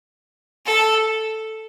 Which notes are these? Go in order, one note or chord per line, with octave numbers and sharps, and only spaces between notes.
A4